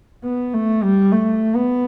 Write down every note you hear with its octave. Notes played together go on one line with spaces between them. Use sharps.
B3
A3
G3
A3
B3